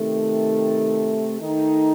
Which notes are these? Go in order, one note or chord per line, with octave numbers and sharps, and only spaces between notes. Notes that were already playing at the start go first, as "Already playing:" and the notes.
Already playing: C3 D#3 A3
D#3 A3 D#4